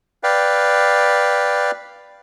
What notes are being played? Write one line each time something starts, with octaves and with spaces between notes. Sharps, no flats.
B4 D5 F5 G5